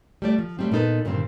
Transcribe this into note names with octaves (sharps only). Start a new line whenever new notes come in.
G3 A3 D5
F3
F#3 G3 A3 C4
A#2 B3 D#4 A4 B4
G2 A#2 D3 D#3 C4